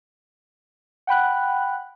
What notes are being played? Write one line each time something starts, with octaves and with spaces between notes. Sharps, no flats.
F#5 G5 B5 F#6